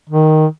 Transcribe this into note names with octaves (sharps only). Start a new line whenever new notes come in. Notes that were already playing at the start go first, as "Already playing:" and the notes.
D#3